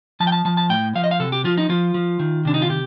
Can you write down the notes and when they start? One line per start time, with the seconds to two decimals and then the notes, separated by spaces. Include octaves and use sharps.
0.20 F3 A5
0.27 G5
0.32 A5
0.45 F3 A5
0.57 A5
0.70 A2 G5
0.95 F3 F5
1.04 D#5
1.11 F5
1.20 C3 A4
1.32 G4
1.44 F3 F4
1.57 D#4
1.69 F3 F4
1.94 F3
2.20 D#3
2.45 C3 D4
2.54 D#4
2.62 F4
2.69 C3 G4